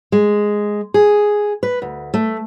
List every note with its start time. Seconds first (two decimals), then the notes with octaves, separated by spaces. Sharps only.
0.12 G#3
0.94 G#4
1.63 B4
1.82 D2
2.14 A3